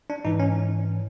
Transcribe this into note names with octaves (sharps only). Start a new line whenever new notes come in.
D4
G#2 E3 D#4
C#4